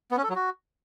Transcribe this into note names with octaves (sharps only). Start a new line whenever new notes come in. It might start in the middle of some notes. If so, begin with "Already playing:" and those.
B3
C#4
A4
F#3
F#4